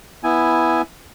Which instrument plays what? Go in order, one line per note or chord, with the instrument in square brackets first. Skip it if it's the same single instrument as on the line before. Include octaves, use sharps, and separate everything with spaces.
[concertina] B3 E4 G#5